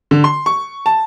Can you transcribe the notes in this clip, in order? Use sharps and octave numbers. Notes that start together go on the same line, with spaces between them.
D3
C6
C#6
A5